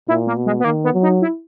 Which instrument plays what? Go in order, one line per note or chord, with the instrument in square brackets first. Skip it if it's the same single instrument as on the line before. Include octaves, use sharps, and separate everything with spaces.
[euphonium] A#2 [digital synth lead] E4
[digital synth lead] A#3
[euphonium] B2
[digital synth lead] G#3
B3
[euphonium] D#3 [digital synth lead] A#3
[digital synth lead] B3
[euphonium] F#3
[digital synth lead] D#4
E4